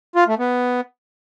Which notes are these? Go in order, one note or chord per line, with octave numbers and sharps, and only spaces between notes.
F4
A3
B3